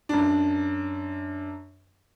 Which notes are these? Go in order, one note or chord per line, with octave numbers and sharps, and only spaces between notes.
F#2 D4